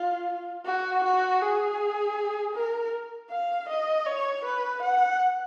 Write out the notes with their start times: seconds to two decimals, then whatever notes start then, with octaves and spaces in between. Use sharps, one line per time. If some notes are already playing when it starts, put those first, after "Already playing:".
Already playing: F4
0.65 F#4
1.04 F#4
1.41 G#4
2.54 A#4
3.30 F5
3.68 D#5
4.06 C#5
4.44 B4
4.82 F#5